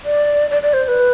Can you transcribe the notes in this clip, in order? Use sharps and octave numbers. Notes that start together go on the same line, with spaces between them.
D5
D5
D5
C5
C5
B4